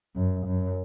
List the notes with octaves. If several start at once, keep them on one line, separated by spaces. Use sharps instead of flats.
F#2
F#2